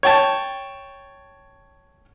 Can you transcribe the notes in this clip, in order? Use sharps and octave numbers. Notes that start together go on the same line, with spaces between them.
C#5 G5 A5